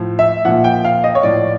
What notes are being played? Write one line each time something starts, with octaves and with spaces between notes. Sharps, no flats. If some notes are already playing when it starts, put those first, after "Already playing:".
Already playing: A2 F3
E5
A#2 F3 F#5
G5
F5
D#5
C#5
A2 F3 D5